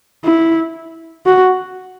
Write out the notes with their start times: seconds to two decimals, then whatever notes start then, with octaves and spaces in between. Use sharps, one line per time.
0.25 E4
1.26 F#4